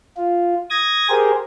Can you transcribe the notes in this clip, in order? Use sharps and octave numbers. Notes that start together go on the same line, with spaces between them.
F4
D#6 G#6 A#6
G4 G#4 A#4 C5